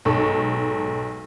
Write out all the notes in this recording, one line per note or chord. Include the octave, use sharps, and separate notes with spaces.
B1 G#2 A4 C#6